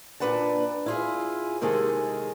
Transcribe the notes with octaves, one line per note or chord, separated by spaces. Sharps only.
A#2 C4 D4 B4 F#5 A5
E4 F4 G#4
C3 D#3 G#3 G#4 A4